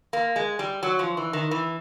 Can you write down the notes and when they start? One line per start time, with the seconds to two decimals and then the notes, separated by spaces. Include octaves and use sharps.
0.13 A#3
0.36 G#3
0.59 G3
0.83 F#3
0.99 F3
1.17 E3
1.33 D#3
1.51 E3